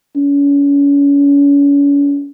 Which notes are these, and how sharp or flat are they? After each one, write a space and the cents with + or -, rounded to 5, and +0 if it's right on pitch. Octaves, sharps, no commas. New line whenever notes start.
C#4 +35